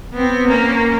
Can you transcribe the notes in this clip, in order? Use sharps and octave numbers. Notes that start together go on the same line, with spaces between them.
B3 C4
A#3 C#4